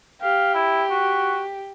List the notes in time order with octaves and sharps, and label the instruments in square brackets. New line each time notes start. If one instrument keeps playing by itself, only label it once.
[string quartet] G4 [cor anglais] F5
[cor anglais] E4
F#4